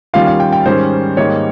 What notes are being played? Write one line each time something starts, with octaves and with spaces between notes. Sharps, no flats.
D#2 D#3 G3 C#4 F4 F5
F5
G5
G5
G#2 D#3 G3 C#4 C5
G#2 D#3 G3 A#3 D#4 C#5